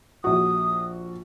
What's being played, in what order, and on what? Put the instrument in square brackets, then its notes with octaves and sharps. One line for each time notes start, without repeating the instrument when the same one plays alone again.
[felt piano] A#1 F#4 [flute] D#6